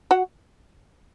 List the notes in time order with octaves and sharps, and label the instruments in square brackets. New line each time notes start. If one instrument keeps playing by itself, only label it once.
[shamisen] F#4 F#5